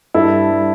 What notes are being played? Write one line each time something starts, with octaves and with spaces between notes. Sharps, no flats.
G2 E4 A4
G3